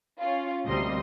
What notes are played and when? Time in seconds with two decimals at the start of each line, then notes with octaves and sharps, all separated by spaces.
0.20 C#4 F4
0.65 D2 C3 G3 A#3 D#5 C6